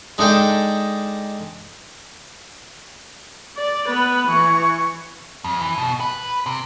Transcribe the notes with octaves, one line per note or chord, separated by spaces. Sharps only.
G#3 D4 D#4 A4 D#5 G5
D5
B3 B4
E3 C#6
F2
E3
B2
B4
C3